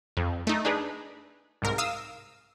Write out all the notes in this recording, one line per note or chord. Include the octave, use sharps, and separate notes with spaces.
F2
A3 D#4
D4 D#4 G#4 B4
C2 G#2 A#4
F5 D#6 E6